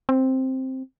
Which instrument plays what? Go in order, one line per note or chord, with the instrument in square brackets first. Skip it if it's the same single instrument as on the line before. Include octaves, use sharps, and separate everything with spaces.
[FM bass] C4